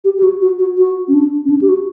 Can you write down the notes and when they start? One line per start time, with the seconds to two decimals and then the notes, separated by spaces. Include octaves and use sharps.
0.04 G4
0.18 G4
0.23 F#4
0.42 F#4
0.59 F#4
0.78 F#4
1.08 C#4
1.14 D4
1.45 C#4
1.50 D4
1.61 G4
1.69 F#4